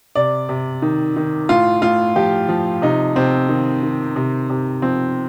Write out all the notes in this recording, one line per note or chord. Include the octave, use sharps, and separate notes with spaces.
C3 D5
C3
D#3
D#3
A2 F4
A2 F4
F3 G4
F3
C3 D#4
C3 C4
D#3
D#3
C3
C3
F3 C4